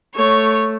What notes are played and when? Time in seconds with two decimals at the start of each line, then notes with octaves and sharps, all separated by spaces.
0.15 A3 C#5